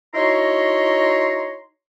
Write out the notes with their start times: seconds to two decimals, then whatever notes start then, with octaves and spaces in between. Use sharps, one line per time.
0.15 D#4 E4 F#4 C#5 A#5 C6